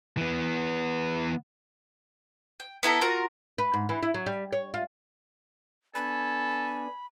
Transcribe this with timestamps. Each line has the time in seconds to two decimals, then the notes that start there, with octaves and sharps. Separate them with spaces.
0.17 E3 B3
2.60 G5
2.83 B3 E4 A4 A#5
3.01 F4 F#4 A#4 A#5
3.58 B4
3.74 G#2
3.89 E3
4.03 E4
4.14 F#3
4.26 G3
4.53 C#5
4.74 F4
5.95 B3 D4 A4 G#5 B5